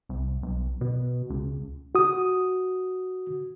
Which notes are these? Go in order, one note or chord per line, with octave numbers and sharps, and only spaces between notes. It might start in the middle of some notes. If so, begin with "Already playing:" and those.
C2
B1
B2
C#2
F#4 D#6